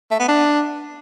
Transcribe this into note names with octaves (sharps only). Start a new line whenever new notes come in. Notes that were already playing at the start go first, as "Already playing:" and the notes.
A3
B3
D4